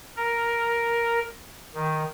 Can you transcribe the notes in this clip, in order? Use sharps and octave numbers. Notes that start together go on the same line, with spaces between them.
A#4
D#3